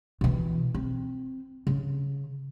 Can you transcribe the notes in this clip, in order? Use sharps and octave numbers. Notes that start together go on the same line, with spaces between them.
B2 E3
C4
C#3